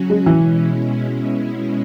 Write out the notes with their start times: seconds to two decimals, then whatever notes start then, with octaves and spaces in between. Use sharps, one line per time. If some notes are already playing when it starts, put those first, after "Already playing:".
Already playing: C#3 F#3 C#4 F#4
0.10 G#3
0.26 B2 E3 G#3 C#4 E4